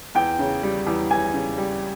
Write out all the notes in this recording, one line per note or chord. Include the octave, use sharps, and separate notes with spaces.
E2 G5
C#3
G3
E2
E2 G#5
C#3
G3